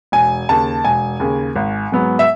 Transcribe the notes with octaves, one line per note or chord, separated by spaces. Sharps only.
E1 G#5
D#2 C#3 A5
E1 G#5
D#2 C#3
G#1
G#2 F#3 B3
E5